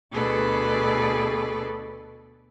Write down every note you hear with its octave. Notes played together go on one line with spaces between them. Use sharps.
D2 B2 G#4 A4 B4 D5